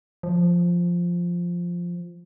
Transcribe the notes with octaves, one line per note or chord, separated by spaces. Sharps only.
F3